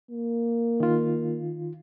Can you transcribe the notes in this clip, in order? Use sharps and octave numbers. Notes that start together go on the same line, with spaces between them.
A#3
D#3 F4